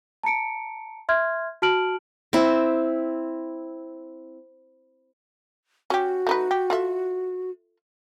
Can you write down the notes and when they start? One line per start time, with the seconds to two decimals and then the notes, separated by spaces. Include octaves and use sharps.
0.23 A5 A#5 C#7 D7
1.09 E5 C6 F6 G#6
1.62 F#4 A5 F6 D7 F#7
2.33 C4 E4
5.90 C#4 F#4 G4
6.27 A3 D#4 B4
6.51 G4
6.70 F4 A4 E5